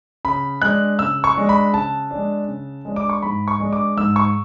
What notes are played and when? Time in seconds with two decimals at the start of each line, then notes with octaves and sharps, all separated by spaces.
0.25 C#3 B5
0.62 G#3 D4 F#6
0.99 C#3 E6
1.24 C#6
1.36 G#3 D4
1.49 B5
1.73 C#3 A5
2.11 G#3 D4
2.48 C#3
2.85 G#3 D4
2.96 D6
3.09 C#6
3.22 G#2 B5
3.48 C#6
3.60 G#3 D4
3.73 D6
3.97 G#2 E6
4.16 C#6